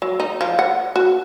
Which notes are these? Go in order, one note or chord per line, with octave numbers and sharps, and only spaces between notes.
F#3
D#4
F3
F#5
F#4